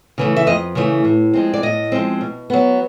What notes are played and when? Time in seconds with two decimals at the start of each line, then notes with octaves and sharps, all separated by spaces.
0.18 C#3 E3 A3
0.37 E5
0.47 F2 D#5
0.75 C#3 E3 A3
1.05 A2
1.33 F3 G#3 C4
1.54 D5
1.63 A2 D#5
1.92 F3 G#3 C4
2.21 B2
2.50 F#3 B3